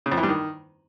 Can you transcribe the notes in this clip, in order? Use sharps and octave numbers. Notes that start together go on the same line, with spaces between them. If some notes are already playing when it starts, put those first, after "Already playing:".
C#3
F2
E3
G2
D#3